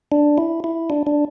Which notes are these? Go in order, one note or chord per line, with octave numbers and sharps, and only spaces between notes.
D4
E4
E4
D4
D4